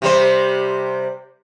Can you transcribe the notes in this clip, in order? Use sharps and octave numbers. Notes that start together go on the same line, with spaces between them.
C3 G3 C5